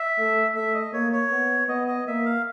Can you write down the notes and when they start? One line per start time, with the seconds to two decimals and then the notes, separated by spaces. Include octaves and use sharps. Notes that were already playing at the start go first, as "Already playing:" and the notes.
Already playing: E5
0.18 A3
0.55 A3 E5
0.74 D#5
0.93 A#3 C#5
1.13 C#5
1.31 B3
1.68 B3 D#5
1.88 D#5
2.07 A#3 E5
2.25 F5